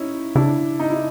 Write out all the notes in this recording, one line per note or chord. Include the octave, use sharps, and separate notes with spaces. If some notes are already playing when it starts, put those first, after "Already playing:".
Already playing: C#4 D#4 E4
C#3 D4 E4
D#4
E4